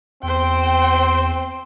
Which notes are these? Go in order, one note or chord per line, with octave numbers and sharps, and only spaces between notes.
E2 C4 C5 G5